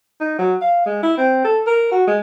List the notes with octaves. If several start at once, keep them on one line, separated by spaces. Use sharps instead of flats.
D#4
F#3
F5
G#3
E4
C4
A4
A#4
F#4
G#3